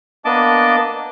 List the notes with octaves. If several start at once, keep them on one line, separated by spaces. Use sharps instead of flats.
A#3 B3 D4 D#5 A5 D6